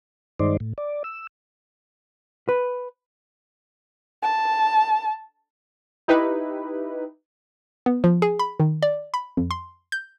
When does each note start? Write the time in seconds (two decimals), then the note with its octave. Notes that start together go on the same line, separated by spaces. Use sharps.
0.40 G2 D#3 G#3 D#4 C5 D5
0.60 A2
0.78 D5
1.04 E6
2.49 B4
4.23 A5
6.08 D#4 E4 G4 B4
7.86 B3
8.04 F3
8.22 G#4
8.39 B5
8.60 D#3
8.82 D5
9.14 B5
9.37 F2
9.51 C6
9.92 G6